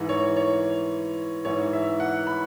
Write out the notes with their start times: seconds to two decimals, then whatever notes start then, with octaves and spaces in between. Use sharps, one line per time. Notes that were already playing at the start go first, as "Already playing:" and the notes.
Already playing: G#2 E3
0.09 C#5
0.37 C#5
1.45 G#2 E3 C#5
1.73 E5
2.00 F#5
2.27 B5